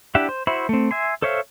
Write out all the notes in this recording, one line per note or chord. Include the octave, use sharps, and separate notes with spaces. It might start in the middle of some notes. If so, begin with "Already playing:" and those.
D4 E4 G4 E5 F#5
C5
E4 F#4 C5 E5 B5
A3 C4
E5 G#5 C6
A4 C5 C#5 E5 F5